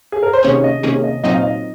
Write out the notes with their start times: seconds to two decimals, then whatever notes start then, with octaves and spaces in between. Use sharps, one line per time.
0.12 G#4
0.23 A#4
0.33 C5
0.43 C3 D#3 A#3 C#4 G#4 C#5
0.64 D#5
0.83 C3 D#3 A#3 C#4 G#4
1.03 D#5
1.23 A#2 F#3 C4 D#4 D#5
1.34 F5
1.43 D#5